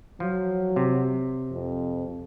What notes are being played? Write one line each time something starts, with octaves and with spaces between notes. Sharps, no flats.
F3 F#3
C3
F2